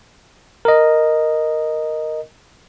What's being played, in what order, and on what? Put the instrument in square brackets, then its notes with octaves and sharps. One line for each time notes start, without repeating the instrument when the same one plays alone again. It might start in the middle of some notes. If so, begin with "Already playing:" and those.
[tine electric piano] A#4 D#5